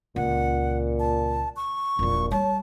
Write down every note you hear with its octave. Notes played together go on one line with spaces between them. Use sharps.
C#2 A#2 F#5
A5
C#6
E1 A#1 A#2
G3 C#5 A5